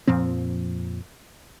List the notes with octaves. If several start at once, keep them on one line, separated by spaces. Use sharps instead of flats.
F2 A#2 F3 C4